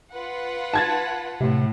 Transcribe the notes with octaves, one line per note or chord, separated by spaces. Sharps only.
F4 B4 F#5
A5 G#6 A6
A2 C3